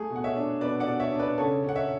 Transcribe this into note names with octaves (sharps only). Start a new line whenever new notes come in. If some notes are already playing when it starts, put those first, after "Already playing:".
Already playing: A3 G#4
B2
F#5
C#5 E5
D4
B2 B4 D5
D5 F#5
B2
C#5 E5
D4
B4 D5
C#3 A4 C#5
C#4
F#5
C#5 E5